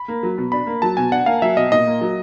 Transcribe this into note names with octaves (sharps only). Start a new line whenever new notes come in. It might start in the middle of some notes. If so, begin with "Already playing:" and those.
Already playing: B5
A#3
F#3
B2
D4 B5
A#3
F#3 A5
B2 G#5
D4 F#5
A#3 F5
F#3 E5
B2 D#5
A#2 D#5
A#3
F#3